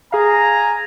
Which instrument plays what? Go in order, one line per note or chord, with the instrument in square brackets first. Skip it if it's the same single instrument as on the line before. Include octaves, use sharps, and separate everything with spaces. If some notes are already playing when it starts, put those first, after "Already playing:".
[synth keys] G#4 F5 [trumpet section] G#5 A#5